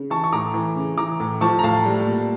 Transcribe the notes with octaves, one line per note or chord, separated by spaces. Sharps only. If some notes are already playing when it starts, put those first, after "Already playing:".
Already playing: C#3
E3 A5 C#6
C#6
A2 A#5 D6
E3
C#3
E3 A#5 D6
A2
F3 A5 C#6
A#5
A2 F5 A5
G3
A#2